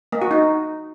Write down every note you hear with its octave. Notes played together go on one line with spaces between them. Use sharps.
A#3
F#4
D#4